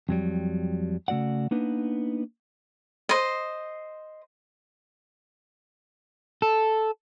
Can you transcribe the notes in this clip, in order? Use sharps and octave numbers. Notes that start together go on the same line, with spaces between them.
F2 F#3 G3
C#3 A3 F#4 D5 F#5
A#3 B3 D4 D#4 B4
C5 D#5
A4